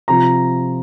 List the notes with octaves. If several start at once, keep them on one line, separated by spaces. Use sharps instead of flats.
C3 F3 A#5